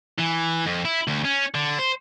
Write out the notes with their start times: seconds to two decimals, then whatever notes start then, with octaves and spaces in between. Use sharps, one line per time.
0.19 E3
0.66 F2
0.85 E4
1.08 D2
1.25 C#4
1.55 D3
1.79 C5